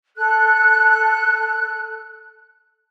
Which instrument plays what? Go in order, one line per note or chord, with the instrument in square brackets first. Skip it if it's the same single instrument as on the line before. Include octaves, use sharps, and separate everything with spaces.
[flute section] A4 F#6